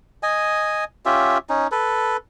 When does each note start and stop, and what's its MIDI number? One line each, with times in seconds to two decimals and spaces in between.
0.23 0.84 75
0.23 0.84 80
1.06 1.38 61
1.06 1.38 65
1.06 1.38 67
1.06 1.38 76
1.49 1.67 61
1.49 1.67 63
1.72 2.17 69
1.72 2.17 71